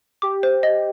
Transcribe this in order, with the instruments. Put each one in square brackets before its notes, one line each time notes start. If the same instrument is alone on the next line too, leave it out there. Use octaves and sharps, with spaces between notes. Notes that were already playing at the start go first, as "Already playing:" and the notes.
[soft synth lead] G4 [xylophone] D6
[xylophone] C5
D#5